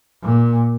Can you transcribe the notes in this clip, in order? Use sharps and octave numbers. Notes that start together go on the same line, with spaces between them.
A#2